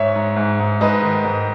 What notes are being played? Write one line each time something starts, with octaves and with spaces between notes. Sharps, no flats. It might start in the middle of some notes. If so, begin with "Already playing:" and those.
Already playing: G#2 C#5 E5
G#2
G#2
G#2
G#2 B4 D#5
D#3
G#2